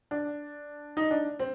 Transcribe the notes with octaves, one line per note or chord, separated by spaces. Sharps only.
D4
D#4
D4
C4